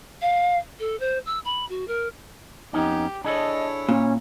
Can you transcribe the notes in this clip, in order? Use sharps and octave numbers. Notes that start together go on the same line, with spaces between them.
F5
A4
C5
E6
B5
F#4
A#4
F2 B3 C#4 D#4 G4
D4 E4 G#4 A4 C#5 D#5
A#2 C#4